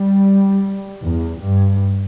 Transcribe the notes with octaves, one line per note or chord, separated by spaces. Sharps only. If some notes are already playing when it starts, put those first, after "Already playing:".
Already playing: G3
E2
G2